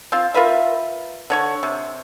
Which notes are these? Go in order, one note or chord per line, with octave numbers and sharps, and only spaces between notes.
C4 F4
F4 A#4 B4 E5
D3 C#5 C#6
C3